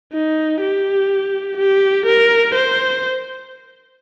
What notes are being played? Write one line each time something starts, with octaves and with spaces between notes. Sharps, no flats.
D#4
G4
G4
A#4
C5